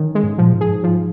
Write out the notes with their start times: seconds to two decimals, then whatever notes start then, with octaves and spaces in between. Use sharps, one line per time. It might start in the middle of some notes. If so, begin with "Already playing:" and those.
Already playing: D#3 C#4
0.15 G#3
0.23 G#2
0.38 A#2 F3
0.53 G#2
0.61 G#4
0.68 G#2
0.84 F3